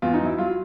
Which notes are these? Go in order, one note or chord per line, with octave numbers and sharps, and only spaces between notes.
E2 F4
D#4
F#3 E4
F#3 F4